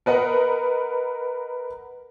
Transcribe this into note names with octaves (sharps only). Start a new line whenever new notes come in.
A#4 B4 D#5 F#5